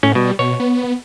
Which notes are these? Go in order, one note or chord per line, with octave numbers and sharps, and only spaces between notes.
A2 C#4
B2 G3
B2 C#5
B3